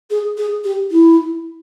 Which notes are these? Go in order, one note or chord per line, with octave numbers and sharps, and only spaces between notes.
G#4
G#4
G4
E4